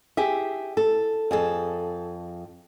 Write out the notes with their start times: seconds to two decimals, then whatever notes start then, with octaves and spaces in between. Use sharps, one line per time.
0.17 G4 G#4 E5
0.77 A4
1.31 F2 G#4 A4